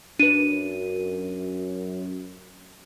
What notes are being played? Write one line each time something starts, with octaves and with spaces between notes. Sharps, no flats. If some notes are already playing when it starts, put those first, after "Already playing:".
F#2 D4 B4 D#7